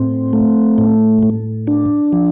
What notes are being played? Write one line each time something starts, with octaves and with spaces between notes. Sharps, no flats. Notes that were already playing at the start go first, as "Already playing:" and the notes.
Already playing: A2 C4
A3
A2
A2
D4
F3